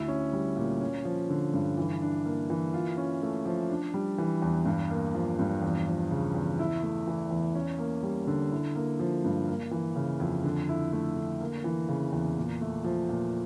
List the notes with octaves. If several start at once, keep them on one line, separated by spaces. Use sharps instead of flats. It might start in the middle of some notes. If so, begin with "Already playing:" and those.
Already playing: D2 E4
C#4
G3
A#2
C#4
F3
D3
G2
E3
D4
A#3
E3
F4
C#4
A3
F3
D4
G3
E3
E2
G2
A#3
F3
G2
E2
F3
C#3
E2
E4
A3
E3
E2
C#4
A#3
G3
D3
E4
A#3
F3
G2
A#3
E3
C#3
F2
D3
E4
A3
D3
A#3
E3
C#3
E2
A#2
A3
F3
A#2